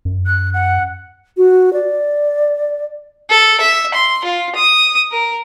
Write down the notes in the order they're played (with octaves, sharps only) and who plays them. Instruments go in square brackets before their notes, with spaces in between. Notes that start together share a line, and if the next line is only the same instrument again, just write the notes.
[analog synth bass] F#2
[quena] F#6
F#5
[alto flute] F#4
D5
[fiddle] A4
E5
C6
F4
D#6
A#4